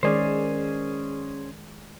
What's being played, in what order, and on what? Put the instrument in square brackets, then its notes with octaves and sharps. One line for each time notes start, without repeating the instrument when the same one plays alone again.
[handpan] D#3 G#3 D5 [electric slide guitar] C#4 G#4 C5